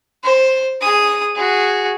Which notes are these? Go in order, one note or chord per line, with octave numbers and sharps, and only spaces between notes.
C5
G#4 D#6
F#4 G#4